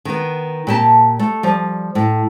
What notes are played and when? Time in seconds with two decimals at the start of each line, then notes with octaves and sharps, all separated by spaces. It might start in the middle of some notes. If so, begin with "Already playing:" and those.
0.05 D#3 B3
0.67 A#2 G4 A5
1.19 A3
1.43 F3 G3
1.95 A2